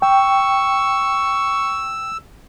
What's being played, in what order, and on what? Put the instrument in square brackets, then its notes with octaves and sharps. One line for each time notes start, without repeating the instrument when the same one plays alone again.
[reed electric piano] G5 [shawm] C#6 [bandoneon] E6